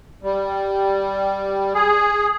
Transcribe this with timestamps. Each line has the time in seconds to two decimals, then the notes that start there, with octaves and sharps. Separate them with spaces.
0.23 G3
1.74 G#4